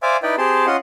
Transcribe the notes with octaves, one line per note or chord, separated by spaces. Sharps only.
C5 D5 E5 F5 G#5 D6
D#4 E4 B4 D5 G5
C4 G4 G#4 A5 C6
C#4 F4 D#5 F#5 C6